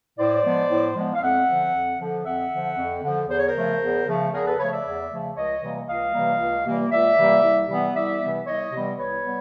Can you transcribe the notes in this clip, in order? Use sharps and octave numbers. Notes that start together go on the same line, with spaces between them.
A2 C5 D5
F3 G#3 B3
A2
F3 G#3 B3
F5
F2 E5 F#5
D3 F3
F2
D3 F3
F2 E5 F#5
D3 F3
F2
D3 F3
E2 C5
C#5
A#4 C5
C#3 F3 A3
E2
C#3 F3 A3
E2 G#4 A#4
A4 B4
C#3 F3 A3 B4 C#5
D5 E5
E2
C#3 F3 A3
C#2 C#5 D#5
C3 E3 G3 A#3
C#2 D#5 F5
C3 E3 G3 A#3
C#2
C3 E3 G3 A#3
C#2 D5 E5
C3 E3 G3 A#3
C2
C3 E3 G3 B3
C2 D5 E5
C3 E3 G3 B3
C2 C#5 D#5
C3 E3 G3 B3
C2 B4 C#5
G3 B3